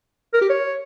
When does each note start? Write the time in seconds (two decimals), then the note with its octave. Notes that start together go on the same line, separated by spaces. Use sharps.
0.34 A#4
0.41 G4
0.49 C#5